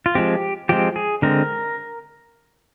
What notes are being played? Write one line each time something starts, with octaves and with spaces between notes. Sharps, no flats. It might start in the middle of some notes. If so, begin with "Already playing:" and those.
F4
F3 G#3 C4 G4
F3 G#3 C4 G4
G#4
D3 G#3 C4 A#4